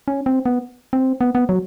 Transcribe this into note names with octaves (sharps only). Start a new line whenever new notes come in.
C#4
C4
B3
C4
B3
B3
F#3